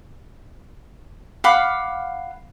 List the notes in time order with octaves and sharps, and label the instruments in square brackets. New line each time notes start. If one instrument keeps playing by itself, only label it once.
[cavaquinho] F5 F#5 B5 D6